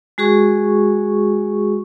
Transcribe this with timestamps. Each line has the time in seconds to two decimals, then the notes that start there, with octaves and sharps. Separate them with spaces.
0.18 G#3 F#4 G#4 C#6